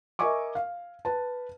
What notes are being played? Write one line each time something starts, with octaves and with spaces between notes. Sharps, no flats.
A#4 D#5 E5 G#5 C#6 D6
F5
B4 A5